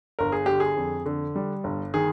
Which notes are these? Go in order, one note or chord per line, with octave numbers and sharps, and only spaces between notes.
G1 A#4
G#4
D3 G4
G#4
F2
D3
G3
G1
D#3 G#4